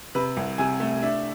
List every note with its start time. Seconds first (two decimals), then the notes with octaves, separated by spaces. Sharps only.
0.15 C3 B4
0.37 C2
0.58 C3 G#5
0.80 A3
1.02 D4 E5